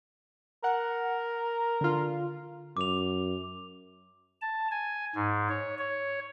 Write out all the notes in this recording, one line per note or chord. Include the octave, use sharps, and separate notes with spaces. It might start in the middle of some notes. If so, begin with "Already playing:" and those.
A#4 F#5
D3 F4
F#2 D6 F7
A5
G#5
G#2
C#5
C#5